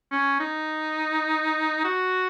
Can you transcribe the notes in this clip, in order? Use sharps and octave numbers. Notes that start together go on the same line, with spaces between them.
C#4
D#4
F#4